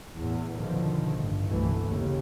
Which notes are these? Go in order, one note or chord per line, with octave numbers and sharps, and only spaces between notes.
E2 A2
E2 B2 D3 D#3 F3
A1 G2
G1 C2 B2 E3 A3
D#2 C#3